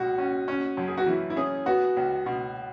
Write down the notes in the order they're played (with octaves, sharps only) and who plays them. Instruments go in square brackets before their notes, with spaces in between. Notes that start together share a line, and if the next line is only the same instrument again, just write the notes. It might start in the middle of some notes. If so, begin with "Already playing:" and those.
Already playing: [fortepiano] C#2 B2 [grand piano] F#4
[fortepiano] C#4
C#4
F#2
[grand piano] G#4
F#4
[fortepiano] E3 [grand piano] E4
[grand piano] E4
[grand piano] C#4 [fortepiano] G#4
[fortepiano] B3 [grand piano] F#4
[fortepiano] C#2
B2